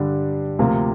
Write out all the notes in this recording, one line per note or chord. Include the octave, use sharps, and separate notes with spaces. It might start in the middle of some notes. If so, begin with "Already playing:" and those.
Already playing: G2 D3 G3 D4
D2 C3 F3 A#3 F4